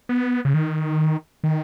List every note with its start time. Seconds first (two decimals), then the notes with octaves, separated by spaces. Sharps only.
0.09 B3
0.45 C#3
0.54 D#3
1.44 D#3